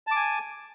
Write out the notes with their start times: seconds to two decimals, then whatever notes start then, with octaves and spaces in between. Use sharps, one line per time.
0.07 A5
0.11 D6
0.16 G#5